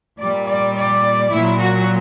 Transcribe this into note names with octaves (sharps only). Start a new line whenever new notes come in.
A#2 G3 D5
D5
D5
A#2 F#3 E4
F#4